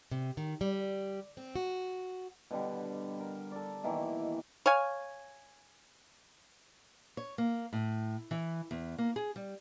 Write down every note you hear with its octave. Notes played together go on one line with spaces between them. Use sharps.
C3
D#3
G3
C4
F#4
B2 D3 G3
A#4
A4 D5
B2 D#3 E3 A#3
C#5 F5 G#5
C#5
A#3
A2
E3
E2
A#3
G#4
G3